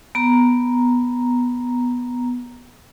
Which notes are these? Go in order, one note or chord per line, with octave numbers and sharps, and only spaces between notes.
B3 A#5